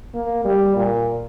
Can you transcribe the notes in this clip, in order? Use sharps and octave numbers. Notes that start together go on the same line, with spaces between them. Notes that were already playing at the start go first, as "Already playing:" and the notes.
A#3
G3
A#2